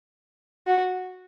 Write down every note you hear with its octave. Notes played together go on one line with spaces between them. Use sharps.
F#4